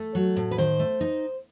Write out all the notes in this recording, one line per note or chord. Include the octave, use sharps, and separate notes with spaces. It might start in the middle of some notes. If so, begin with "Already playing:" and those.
Already playing: A3 A4
F#3
A2
B4
D#3 C5
A3
D#4